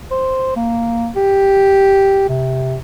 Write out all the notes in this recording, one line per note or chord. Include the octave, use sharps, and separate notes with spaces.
C5
A#3
G4
C3